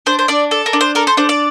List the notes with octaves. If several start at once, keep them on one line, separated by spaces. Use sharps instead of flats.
D4 C5
C5
D4 D5
A4
A#4
D4
C5
A4 A#4
C5
D4 C5
D5